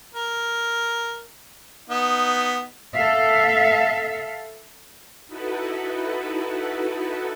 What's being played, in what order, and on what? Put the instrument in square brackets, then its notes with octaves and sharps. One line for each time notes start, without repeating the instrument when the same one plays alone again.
[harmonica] A#4
B3 D#4
[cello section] A4 E5 F5
[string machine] D#4 E4 F#4 A4 B4